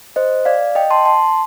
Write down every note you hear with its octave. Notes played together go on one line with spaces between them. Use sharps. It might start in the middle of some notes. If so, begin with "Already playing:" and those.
C5 D#5
D5 F5
D#5 G5
A5 C6
A5 C6